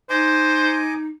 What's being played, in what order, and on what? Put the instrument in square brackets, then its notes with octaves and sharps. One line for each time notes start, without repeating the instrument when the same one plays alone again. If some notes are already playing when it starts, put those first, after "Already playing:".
[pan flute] D#4 [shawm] C5 [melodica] D#5 G#5 D6